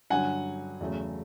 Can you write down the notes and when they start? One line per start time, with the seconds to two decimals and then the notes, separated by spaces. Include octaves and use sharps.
0.10 G2 D3 F#3 F#5 G#5
0.81 E2 C#3 F#3 A3